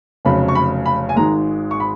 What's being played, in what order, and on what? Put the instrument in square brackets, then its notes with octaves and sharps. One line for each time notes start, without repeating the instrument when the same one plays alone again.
[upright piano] F1 F2 C#3 F#3 B5
C#6
B5
B5
G#5
G#1 G#2 D#3 G#3 A#5
C#6
B5